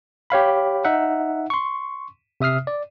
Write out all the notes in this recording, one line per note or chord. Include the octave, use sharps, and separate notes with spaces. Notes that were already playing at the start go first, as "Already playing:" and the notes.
G4 C#5 F5 B5
D#4 E5 F#5
C6 C#6
C3 E5 D#6 F6 C7
D5